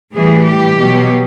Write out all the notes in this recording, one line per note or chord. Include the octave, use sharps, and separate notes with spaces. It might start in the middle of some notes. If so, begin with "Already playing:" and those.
A2 E3 G3 G#4
G4
B2 F#3